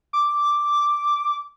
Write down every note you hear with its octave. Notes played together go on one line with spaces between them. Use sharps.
D6